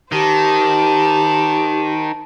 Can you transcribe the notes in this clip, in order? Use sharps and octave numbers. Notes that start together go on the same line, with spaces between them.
D#3 G4 C5 A5